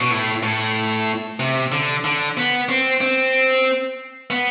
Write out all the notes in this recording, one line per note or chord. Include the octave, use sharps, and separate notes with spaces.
B2
A2
A2
C3
D3
D3
B3
C4
C4
B3